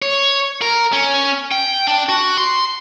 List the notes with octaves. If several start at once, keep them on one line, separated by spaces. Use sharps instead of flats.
C#5
A#4
C#4
G5
D4
F#4
C6